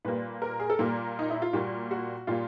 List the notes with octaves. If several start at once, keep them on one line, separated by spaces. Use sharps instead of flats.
A#2 G3 A#3 B4
A#4
G#4
A4
A#2 G3 A#3 A#4
D#4
E4
F4
A#2 G3 A#3 F#4
F#4
A#2 G3 A#3 F4